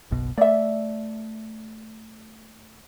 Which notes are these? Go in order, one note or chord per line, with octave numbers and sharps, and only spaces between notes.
F#1 B1 B2
A3 D5 E5